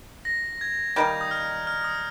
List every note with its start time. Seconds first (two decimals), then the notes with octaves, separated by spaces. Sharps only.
0.25 A#6
0.61 G#6
0.96 D#3 G3 A#3 D#4 G6
1.21 D#6
1.31 F6
1.67 F6
1.84 D#6